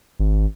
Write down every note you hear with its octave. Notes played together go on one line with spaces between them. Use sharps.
G#1